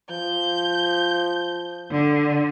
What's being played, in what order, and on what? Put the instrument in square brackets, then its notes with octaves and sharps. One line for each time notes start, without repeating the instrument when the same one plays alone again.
[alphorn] F3 [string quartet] G6
[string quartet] D3